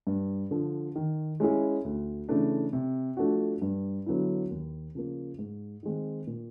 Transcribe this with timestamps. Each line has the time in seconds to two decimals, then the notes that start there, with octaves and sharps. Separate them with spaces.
0.07 G2
0.51 D3 F3
0.96 D#3
1.40 G#3 C#4 E4 G#4
1.84 D2
2.29 C#3 E3 A3 D4
2.73 C3
3.17 F3 A3 D4 F#4
3.62 G2
4.06 D3 F#3 B3 E4
4.50 D#2
4.95 C#3 F3 A#3
5.39 G#2
5.83 D#3 G#3 C4
6.27 A#2